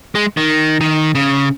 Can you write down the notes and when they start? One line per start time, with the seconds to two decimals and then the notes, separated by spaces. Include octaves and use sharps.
0.15 G#3
0.37 D#3
0.81 D#3
1.15 C#3